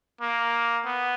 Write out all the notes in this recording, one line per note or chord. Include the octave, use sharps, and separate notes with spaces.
A#3
B3